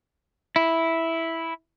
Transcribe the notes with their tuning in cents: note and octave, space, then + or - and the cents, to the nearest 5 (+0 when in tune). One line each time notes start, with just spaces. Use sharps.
E4 -5